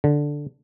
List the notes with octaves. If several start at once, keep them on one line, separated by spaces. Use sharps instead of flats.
D3